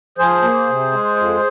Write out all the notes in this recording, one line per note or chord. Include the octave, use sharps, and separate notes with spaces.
F3 G#4 C5
A#3
C3
G#3
F2